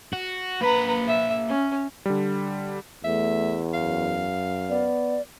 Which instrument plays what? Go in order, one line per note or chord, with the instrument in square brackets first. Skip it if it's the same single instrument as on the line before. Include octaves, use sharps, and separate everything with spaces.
[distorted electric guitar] F#4
[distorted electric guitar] A#3 B5 [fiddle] B4 A#5
[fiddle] E5
C#4
[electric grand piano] D3 G3
[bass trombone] E2 [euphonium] A3 [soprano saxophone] E5
[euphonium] F#2 [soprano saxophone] F5
[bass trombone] B3 [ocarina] D5